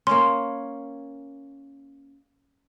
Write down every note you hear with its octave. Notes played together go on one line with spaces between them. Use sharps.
A#3 C#4 C6